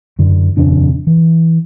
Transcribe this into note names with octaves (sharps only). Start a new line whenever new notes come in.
F#2 D3
D#1 F2 C#3 D4
E3